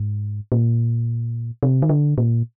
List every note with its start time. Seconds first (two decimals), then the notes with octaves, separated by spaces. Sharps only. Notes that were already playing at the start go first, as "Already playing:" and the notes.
Already playing: G#2
0.52 A#2
1.63 C3
1.82 D#3
1.89 D3
2.18 A#2